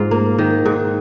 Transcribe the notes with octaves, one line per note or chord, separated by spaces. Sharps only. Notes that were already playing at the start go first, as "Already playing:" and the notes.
Already playing: G#2 F4
A#3
D#3
G#2